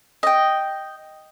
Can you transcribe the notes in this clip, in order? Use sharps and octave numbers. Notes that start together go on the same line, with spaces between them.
D#5 G5